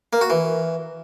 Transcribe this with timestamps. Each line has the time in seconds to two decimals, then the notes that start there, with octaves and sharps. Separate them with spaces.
0.13 A#3
0.21 F#4
0.30 E3